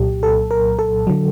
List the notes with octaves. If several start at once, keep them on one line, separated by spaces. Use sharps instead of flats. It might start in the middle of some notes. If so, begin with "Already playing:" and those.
Already playing: C2 A#2 F#3 G4
A4
A#4
A4
D3 F#3